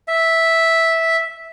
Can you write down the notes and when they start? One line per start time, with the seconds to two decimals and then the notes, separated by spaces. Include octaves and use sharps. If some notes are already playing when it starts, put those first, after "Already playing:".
0.08 E5